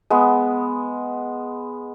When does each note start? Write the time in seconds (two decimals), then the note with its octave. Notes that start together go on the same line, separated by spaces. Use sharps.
0.10 G#3 B3